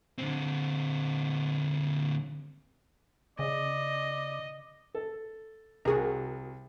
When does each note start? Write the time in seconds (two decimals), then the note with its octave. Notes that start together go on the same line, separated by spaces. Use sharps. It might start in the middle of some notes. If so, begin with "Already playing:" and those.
0.18 D3 C4
3.39 C#3 D5 D#5
4.95 A4
5.85 C2 F#4 G#4 A#4